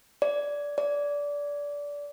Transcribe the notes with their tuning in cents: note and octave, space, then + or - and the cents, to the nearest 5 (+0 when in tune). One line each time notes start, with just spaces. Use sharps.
D5 -15
D5 -20